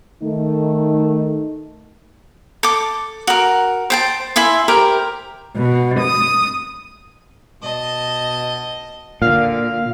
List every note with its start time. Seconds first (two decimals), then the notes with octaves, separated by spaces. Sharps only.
0.23 D#3 A3 D#4
2.63 A4 D6
3.27 F#4 A#4
3.90 C5 G5 A5
4.36 E4 E5 G#5 C6
4.68 G4 A#4 C5 G5
5.57 B2
6.01 D#6
7.62 B2 D#5 A5
9.22 A#2 D3 F5